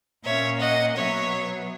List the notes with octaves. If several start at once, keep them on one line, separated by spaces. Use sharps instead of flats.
A#2 A#3 C#4 C#5 E5
D#5 F#5
B2 F#3 B3 C#5 E5